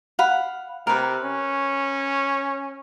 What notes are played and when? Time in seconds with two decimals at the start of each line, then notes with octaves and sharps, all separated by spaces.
0.19 F5 F#5 B5
0.87 C3 A#4 B4
1.24 C#4